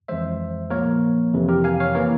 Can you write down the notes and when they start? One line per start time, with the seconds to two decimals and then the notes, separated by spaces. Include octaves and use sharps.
0.08 F2 E3 G#3 C5 E5
0.70 A#2 F3 A#3 A#4 C#5
1.33 F2 C3 E3
1.49 G4 A#4
1.64 F5 G#5
1.80 C#5 F5
1.95 E3 A#3 A#4 C#5